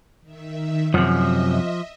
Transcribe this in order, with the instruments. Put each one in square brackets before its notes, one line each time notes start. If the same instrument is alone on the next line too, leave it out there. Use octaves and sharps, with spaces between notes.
[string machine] D#3 E5
[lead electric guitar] F#2 C3 [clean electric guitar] F3 [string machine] D#5 E5